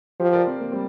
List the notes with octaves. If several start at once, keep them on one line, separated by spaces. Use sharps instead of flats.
F3 G4 C5
A#4 D5
C4
A#3
G3 C4